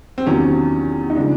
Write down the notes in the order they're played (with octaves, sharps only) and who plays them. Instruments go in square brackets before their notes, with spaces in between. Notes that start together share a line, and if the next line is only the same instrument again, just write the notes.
[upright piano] C4
E2 C3 D#3 F#3 C#4
D#4
C#3 F3 G#3 D4